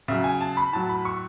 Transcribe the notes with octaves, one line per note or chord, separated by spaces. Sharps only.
C#3 F#3 E5
G#5
A5
B5
A2 F#3 A5
B5
C#6